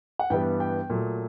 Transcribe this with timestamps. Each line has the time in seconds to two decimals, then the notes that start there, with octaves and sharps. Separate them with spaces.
0.19 F#5
0.30 G2 E3 G3 B3 G5
0.60 G5
0.90 A#2 F#3 A3